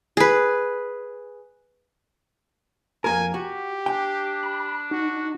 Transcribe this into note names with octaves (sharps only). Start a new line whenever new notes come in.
G#4 B4
F2 A#3 A#4 G#5
F#4 G4
D4 G5
B5
D#4 F#4